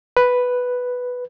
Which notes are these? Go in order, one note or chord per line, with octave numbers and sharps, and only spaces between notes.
B4